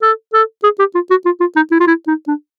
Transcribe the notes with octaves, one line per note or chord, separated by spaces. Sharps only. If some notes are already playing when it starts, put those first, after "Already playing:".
A4
A4
G#4
G4
F4
F#4
F4
F4
D#4
E4
F4
E4
D#4
D4